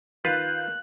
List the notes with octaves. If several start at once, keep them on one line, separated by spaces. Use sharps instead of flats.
D#3 F4 B4 F5 F#6 G6 A6